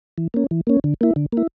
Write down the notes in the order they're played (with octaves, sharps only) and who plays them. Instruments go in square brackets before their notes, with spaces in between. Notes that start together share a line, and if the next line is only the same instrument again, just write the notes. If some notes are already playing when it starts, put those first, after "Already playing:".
[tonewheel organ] E3
A#3 C#4
E3
A#3 C#4
D3
A#3 E4
D3
A#3 E4